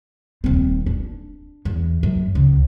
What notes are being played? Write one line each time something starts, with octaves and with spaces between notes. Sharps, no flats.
D#1 C4
D4
E2
F#2
C#2